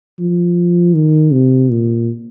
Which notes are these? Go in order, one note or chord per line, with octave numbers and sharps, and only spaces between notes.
F3
D#3
C3
A#2